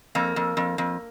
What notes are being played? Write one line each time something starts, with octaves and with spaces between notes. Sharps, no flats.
F2 A#3
F2
F2
F2